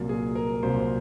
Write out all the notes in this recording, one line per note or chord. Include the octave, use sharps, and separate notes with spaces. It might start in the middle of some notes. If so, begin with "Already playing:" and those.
Already playing: C2 A#2 F#3 A#3
G#4
A#4
C2 A#2 F#3 A#3 C5